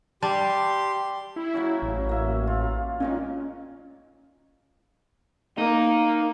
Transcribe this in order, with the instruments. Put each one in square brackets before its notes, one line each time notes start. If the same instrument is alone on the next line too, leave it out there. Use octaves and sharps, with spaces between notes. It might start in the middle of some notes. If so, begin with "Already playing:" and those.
[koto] G3 [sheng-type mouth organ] G4 C6 [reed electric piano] A5
[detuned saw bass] E4
[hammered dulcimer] C#3 F#3 C#4
[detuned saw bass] A1
[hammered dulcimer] A#3 E5
F4
[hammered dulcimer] A#2 D#3 G#3 [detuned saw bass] C#4
[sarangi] A#3 [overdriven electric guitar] D#4